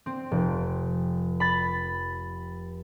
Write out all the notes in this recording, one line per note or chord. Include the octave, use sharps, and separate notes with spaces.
C4
F1
B5 A6